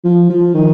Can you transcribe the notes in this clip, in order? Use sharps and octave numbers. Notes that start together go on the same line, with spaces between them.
F3
F3
D#3